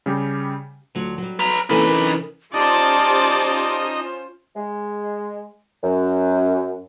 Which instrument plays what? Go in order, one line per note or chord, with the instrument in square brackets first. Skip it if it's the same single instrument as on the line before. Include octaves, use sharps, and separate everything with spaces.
[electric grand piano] C#3 G3 G4
[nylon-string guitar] D2 F#3 F4
F#3 G3
[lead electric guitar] B4 A#5
[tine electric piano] C3 E3 C#4 [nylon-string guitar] A#3 A4 D#5 [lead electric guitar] D#4 B4
[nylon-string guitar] A#4
[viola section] C#4 F4 C5 [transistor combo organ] D#4 [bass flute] G4 [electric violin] D5 A5
[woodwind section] G#3
F#2